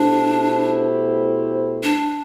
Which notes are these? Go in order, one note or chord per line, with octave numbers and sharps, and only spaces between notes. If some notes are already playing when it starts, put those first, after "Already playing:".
Already playing: B2 A3 D4 E4 G4 C5
D4